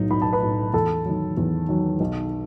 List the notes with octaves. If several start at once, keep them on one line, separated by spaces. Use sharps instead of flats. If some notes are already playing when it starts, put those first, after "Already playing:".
Already playing: B1 A2 F#3 D#4
B1 B5
A5
B4 B5
A2 F#3
E2 A4 A5
D#3 F#3
E2
D#3 F#3
B1